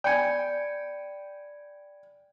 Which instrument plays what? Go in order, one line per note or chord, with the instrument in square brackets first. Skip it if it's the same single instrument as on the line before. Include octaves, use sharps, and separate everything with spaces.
[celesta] D5 B5 C#7 [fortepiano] G5 G#5